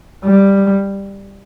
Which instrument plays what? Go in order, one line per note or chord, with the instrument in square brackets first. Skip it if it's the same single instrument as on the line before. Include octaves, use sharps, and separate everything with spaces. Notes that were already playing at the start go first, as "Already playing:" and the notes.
[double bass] G3